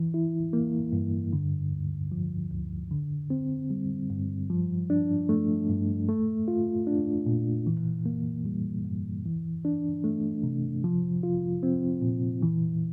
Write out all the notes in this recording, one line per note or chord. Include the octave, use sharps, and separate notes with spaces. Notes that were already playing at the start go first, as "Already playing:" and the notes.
Already playing: E3
E4
A#3
G2
D3
D2
F3
D2
D3
C4
G3
G2
F3
D4
A3
G2
A3
F4
D4
A#2
E3
A#3
G3
G2
E3
D4
A3
C3
F3
F4
C4
A#2
E3